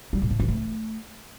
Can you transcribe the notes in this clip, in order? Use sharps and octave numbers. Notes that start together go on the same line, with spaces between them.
G3
A#2
A2
E3
A3